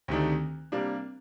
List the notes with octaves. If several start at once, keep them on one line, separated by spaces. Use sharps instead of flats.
D2 C3 D#3 A3 D4
C3 G3 A#3 D4